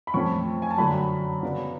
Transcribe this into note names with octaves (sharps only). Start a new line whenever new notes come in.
B5
F2 F3 A3 C#4 C#6
G#5
A5
F#2 D3 F#3 B5
C#3 F#3 B3 D4